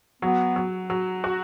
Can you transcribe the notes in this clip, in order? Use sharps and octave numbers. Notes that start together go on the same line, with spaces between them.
F#3 B3
F#3
F#3
F#4